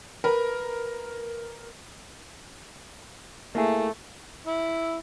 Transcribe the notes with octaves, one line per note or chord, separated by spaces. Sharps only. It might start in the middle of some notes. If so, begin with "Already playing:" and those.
A#4 B4
A3 A#3 E4 G#4
E4